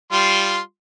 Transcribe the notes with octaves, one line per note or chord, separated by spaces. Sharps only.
G3 F4 C6